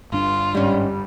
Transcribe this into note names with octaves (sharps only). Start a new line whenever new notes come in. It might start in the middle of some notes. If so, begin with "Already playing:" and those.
G1 G2 D4 F4
G#2 G3 C#4